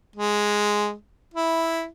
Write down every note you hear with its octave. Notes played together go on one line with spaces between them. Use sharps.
G#3
E4